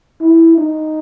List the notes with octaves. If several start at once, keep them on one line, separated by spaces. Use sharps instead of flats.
E4
D#4